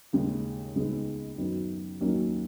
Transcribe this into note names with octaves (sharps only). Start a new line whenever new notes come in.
D#2 C#3 G#3 C#4
C#2 C#3 G#3 B3 D#4
F#2 D#3 F#3 B3
D#2 D#3 F#3 A#3 C#4